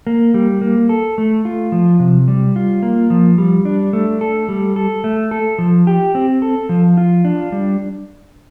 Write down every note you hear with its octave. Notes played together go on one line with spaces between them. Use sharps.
A#3
G3
A#3
A4
A3
F4
F3
C3
G3
F4
A#3
F3
G3
D4
A3
A4
G3
A4
A3
A4
F3
G4
C4
A4
F3
F4
D4
G3